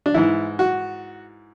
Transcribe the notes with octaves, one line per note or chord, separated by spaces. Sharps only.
D4
G#2 E3 E4
F#4